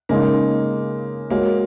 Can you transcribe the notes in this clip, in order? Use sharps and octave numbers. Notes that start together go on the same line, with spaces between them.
C#3 G#3 A#3 D#4
G#3 A#3 F#4 C#5